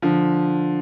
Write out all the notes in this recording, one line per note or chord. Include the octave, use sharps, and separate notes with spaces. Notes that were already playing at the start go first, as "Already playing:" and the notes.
D3 F3